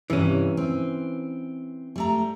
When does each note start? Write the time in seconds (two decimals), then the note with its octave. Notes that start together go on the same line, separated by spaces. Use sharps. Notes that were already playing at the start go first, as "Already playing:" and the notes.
0.10 G2 C3 E3 C#4
0.57 C4
1.96 G3 A3 A#5